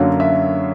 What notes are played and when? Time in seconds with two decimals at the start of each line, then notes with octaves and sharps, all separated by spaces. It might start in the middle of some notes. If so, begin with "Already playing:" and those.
Already playing: F#2 D3 F#3 A#3 F5
0.20 E5